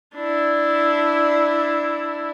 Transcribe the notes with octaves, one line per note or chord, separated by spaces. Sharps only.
D4 E4